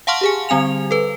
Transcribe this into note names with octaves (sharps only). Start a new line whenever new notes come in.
F5 F#5 A5 C6 C#6 F6
G4 G#4 G#5
D3 G3 C4 G#5 F7
A4 B4